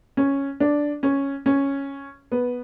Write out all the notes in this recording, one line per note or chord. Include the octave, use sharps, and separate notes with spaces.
C#4
D4
C#4
C#4
B3